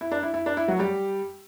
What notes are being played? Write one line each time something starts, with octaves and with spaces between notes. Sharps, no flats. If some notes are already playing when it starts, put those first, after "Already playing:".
E4
D4
E4
E4
D4
E4
F#3 F#4
G3 G4